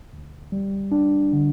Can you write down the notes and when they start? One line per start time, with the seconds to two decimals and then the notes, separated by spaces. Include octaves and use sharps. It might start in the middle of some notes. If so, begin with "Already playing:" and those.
0.13 D2
0.52 G3
0.92 D4
1.32 D3